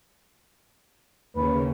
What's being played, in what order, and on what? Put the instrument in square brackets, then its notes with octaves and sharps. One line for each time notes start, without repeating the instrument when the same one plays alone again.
[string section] D#2 C#3 [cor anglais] B4